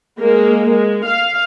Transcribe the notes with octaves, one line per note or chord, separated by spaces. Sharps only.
G#3 A#3
G#3
F5